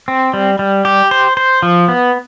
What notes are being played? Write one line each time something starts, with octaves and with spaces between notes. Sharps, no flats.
C4
G3
G3
G4
C5
C5
F3
B3